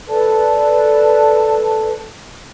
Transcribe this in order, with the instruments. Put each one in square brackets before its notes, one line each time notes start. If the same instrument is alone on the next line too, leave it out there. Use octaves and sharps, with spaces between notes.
[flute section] A4 B4 D5 A5